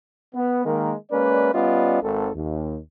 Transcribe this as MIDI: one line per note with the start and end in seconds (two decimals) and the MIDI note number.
0.35 0.63 59
0.65 0.94 51
0.65 0.94 56
0.65 0.94 58
0.65 0.94 70
1.11 1.52 56
1.11 1.52 58
1.11 1.52 61
1.11 1.52 71
1.11 1.52 74
1.53 2.01 55
1.53 2.01 59
1.53 2.01 61
1.53 2.01 65
1.53 2.01 74
1.53 2.01 75
2.03 2.29 32
2.03 2.29 69
2.35 2.78 39